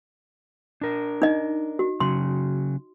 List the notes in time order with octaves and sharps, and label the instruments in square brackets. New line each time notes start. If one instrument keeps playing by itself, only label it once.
[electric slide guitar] D4 A#4
[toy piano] D#4 D#5
F#4
[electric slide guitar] C#3 F#3 [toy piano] C6